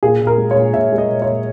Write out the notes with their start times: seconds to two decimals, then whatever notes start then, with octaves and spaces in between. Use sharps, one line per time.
0.03 A#2 G#4
0.21 A#2
0.27 A#4
0.38 G#3
0.51 A#2 C#5
0.74 A#2 E5
0.92 G#3
0.98 D#5
1.10 A#2
1.22 C#5
1.27 A#2